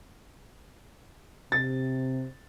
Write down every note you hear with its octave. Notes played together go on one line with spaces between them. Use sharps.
C3 A6